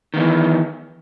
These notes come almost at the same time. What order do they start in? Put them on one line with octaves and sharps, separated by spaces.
D#3 B3 E3